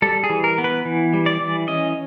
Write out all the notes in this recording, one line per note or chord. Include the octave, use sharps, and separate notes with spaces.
G3 A4
G#4
E3
A#4
B3
B4
E3
G3
D5
E3
C#4 D#5